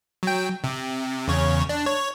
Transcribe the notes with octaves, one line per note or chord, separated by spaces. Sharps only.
F#3 G5
C3
E2 C#3 C#5
D4
C#5